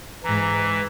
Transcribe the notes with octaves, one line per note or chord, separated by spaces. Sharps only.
G#2 E3 A#5